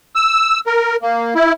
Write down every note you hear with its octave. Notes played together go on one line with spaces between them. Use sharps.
E6
A#4
A#3
E4